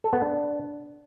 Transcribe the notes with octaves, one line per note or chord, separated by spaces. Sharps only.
A4
B3
D4